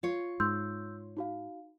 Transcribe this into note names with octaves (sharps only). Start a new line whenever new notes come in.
F4 C#5
G#2 C6 E6 G6
D#4 F#4 F5